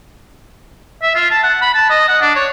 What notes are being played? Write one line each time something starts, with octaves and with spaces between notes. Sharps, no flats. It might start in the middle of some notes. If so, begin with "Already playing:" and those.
E5
F4
A5
F#5
B5
A5
D#5
F#5
D4
C#5